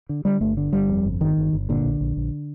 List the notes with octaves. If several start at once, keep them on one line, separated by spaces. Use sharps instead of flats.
D3
D3 G3
G1 A3
D3
G1 G3
F2
G1
G1 D#3
G1
G1
A#2 D3
A#1
A#1
A#1